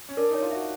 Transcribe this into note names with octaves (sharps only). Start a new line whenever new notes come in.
C#4
D4 A#4
D#4 C#5
F4
F#4 E5